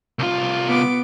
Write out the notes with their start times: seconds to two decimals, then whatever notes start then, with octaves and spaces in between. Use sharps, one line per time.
0.19 C2 F4
0.66 B3 D6